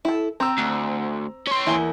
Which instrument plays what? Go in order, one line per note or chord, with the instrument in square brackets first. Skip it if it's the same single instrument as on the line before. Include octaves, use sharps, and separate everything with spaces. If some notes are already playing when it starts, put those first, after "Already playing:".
[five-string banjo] E4 A4
[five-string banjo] C4 [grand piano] A#5 E6
[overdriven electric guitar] D2
C#4 C6
[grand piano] E2 G#5 G7 [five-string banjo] A#3 E4